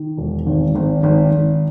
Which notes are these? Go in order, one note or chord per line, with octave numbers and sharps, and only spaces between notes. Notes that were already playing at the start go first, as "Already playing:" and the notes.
Already playing: D#3
E1
G#1
G#1
G#1
G#1